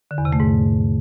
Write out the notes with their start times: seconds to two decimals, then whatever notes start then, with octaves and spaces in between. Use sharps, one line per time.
0.11 D3
0.18 E2
0.25 C3
0.33 A3
0.40 G#2